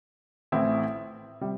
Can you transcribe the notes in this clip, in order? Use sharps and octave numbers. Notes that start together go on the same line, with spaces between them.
A1 A2 E3 C4 E4
C3 G3